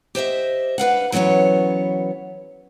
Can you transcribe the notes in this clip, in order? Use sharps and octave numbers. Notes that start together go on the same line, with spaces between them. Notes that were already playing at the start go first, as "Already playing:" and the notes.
G4 C5 D#5 E5
D4 B4 F5 F#5
E3 F#3 B3 C#4 C#5